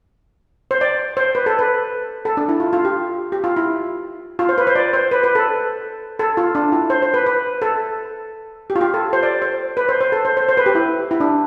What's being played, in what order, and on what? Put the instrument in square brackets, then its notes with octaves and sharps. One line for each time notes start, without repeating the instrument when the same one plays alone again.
[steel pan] C5
D5
C5
B4
A4
B4
A4
D4
E4
F4
F4
G4
G4
F4
E4
F4
C5
B4
C5
D5
C5
B4
B4
A4
A4
F4
D4
E4
C5
C5
B4
B4
A4
G4
F4
G4
A4
C5
D5
C5
B4
C5
C5
A4
C5
C5
C5
B4
G4
E4
E4
D4